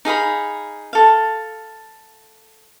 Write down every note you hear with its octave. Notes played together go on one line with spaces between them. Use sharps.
D#4 G#4 F5 B5
A4 F5